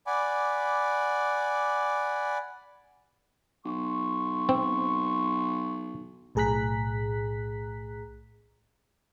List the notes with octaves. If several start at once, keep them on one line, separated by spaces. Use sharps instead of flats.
D5 F#5 G#5 B5 D6
B1 C6 C#6
C4
B1 A2 G#4 A#5 F#6 B6